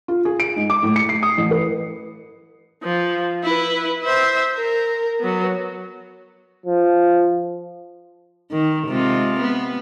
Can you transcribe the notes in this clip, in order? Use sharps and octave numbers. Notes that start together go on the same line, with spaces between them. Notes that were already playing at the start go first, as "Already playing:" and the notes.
F4
G#4
D7
G#2
D6
A2
C#7
C7
D#6
A1
B4
F3
E4 B4
C5 E5
A#4
F#3 B3
F3
D#3
C3 G#3 F4
B3